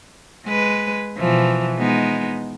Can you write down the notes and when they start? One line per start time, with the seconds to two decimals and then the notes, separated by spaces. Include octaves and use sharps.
0.46 G#3 B4
1.18 B2 E3 F3
1.78 G#3 B3 D#4